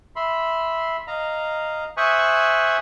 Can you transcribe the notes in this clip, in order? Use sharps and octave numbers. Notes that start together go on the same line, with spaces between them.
E5 B5 C6
D#5 F5 A#5
C5 E5 G#5 C#6 D#6 F#6